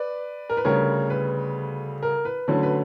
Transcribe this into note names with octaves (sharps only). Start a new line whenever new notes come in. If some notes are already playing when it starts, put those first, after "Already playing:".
Already playing: B4 D5
A#4
B4
D2 C#3 G3 A#4 C#5
B4
A#4
B4
D2 D3 F#3 C#4
B4